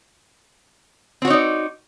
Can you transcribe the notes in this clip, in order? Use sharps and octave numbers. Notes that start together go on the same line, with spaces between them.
C4 D#4 F#4 C#5 D5